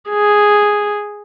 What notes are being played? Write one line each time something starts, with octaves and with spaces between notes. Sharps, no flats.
G#4